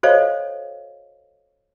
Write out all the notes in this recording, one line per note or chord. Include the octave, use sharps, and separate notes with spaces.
F#4 A4 C5 C#5 D#5 F5